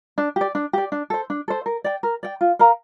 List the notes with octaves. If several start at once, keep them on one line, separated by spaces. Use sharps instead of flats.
D4
G4 D5
D4
G4 D5
D4
A4 C5
D4
A4 C5
A#4
D5 G5
A#4
D5 G5
F4
A#4 F5 A#5